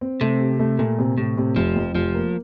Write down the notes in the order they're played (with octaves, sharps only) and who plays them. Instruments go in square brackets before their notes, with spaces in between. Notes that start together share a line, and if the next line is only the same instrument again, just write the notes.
[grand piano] C4
[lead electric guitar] C3 [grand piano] A3
[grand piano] G4
A3
[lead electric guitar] A#2 [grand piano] A3
[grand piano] C3
[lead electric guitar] A2 [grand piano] C3
[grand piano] C3
[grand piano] F1 [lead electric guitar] F3
[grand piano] F2
[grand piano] F1 [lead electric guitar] F3
[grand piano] A#3